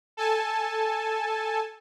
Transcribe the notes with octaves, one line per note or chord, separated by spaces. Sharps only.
A4 G#5 A5